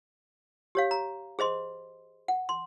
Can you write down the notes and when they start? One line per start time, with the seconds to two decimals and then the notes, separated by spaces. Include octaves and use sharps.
0.75 G4 C#5 F5
0.91 A#5
1.39 G#4 C5 D#5 C6
2.28 F#5
2.49 C6